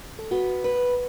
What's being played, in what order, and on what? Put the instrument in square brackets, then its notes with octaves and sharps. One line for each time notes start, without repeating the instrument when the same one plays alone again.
[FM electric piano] A4
[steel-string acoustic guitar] B3 [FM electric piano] F#4
[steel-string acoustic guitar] B4